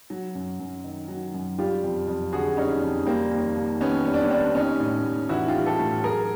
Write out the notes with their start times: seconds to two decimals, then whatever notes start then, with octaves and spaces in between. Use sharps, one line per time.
0.10 F#3
0.35 F#2
0.59 F#2
0.84 D#3
1.08 F#3
1.33 F#2
1.58 G3 F4 G4
1.83 F2
2.07 F2
2.32 D3 F#4 G#4
2.57 G3 C#4 D#4
2.82 F2
3.07 G3 A#3 C4
3.31 D#2
3.56 D#2
3.80 D#3 B3 C#4
4.05 G3 C#4
4.14 D4
4.22 B3 C#4
4.30 D#2 C4 D4
4.55 G3 C#4 D#4
4.80 A2
5.05 A2
5.29 E3 E4 F#4
5.48 F4 G4
5.54 G3
5.66 G4 A4
5.79 A2
6.04 F#3 G#4 A#4